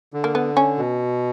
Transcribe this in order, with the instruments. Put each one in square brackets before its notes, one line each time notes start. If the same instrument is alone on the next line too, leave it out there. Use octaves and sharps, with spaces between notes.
[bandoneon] D3
[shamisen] A#3
B3
C#4
[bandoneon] B2